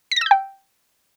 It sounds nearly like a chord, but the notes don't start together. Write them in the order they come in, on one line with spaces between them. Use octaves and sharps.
B6 A#6 E6 G6 G5